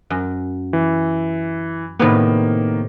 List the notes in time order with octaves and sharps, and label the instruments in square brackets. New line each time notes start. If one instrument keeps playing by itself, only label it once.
[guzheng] F#2
[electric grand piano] E3
[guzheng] A2 C3 B3 [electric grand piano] D#3 A#3